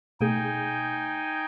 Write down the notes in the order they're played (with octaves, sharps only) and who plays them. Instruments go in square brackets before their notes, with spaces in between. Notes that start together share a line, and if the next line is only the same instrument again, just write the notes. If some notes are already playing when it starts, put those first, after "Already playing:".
[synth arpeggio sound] B2 A3 G#4 [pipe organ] D#4 G5 G#5